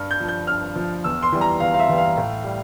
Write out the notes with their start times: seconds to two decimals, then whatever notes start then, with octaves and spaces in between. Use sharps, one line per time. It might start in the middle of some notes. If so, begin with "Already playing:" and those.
Already playing: G2 F6
0.11 G6
0.20 F3
0.28 G6
0.47 G2 F6
0.75 F3
1.04 E2 E6
1.22 C6
1.32 E3 G3
1.41 A#5
1.60 E2 F5
1.74 F5
1.79 E5
1.89 E3 G3
1.98 F5
2.17 A2
2.44 G3